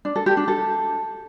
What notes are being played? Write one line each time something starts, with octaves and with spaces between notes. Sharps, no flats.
D4
A4
G4
D4
A4